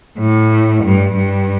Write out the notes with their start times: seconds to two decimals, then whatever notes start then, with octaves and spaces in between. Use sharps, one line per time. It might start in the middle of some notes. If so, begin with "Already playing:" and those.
0.19 A2
0.84 G2
1.16 G2